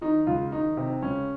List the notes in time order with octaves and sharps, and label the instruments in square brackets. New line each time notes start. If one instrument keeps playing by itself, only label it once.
[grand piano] D#3 D#4
C#2 F4
D#3 D#4
C3
C#2 C#4